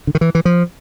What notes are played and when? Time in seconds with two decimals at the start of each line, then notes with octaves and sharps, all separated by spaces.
0.07 D3
0.15 D#3
0.21 E3
0.35 E3
0.45 F3